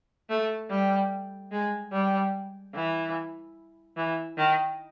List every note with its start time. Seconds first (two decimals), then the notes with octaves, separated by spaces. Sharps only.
0.30 A3
0.70 G3
1.51 G#3
1.92 G3
2.75 E3
3.97 E3
4.38 D#3